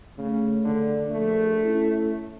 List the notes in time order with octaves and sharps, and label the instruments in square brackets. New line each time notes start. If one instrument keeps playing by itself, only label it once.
[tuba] C#3 [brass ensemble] A3
[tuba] D3
[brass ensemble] A#1 [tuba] A3
[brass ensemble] C#4 E4